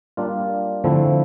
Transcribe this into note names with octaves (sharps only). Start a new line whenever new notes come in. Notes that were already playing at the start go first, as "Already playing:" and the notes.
G3 A#3 D4 F4
D3 F3 A3 C4 E4